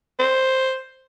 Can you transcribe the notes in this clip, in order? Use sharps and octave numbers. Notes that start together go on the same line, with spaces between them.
C5